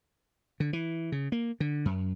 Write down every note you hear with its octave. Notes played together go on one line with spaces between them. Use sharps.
D3
E3
C#3
A#3
D3
F#2